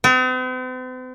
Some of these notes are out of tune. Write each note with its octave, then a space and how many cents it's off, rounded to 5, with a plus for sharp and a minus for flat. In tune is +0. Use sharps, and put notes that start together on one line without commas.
C4 -45